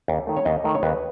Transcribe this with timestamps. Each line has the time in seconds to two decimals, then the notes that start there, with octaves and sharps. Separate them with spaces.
0.08 D#2
0.27 D#3 A3
0.37 C#5
0.45 D#2 D#5
0.64 D#3 A3
0.75 C#5
0.83 D#2 B4